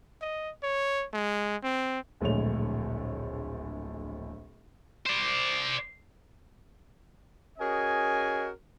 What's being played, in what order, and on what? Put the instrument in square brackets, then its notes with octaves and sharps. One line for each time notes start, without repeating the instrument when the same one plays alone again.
[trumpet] D#5
C#5
G#3
C4
[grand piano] D1 A#1 G#3 A3 C#5 F7
[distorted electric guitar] C5 D5
[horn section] C#4 F#4 G#4 A#4 D#5 G#5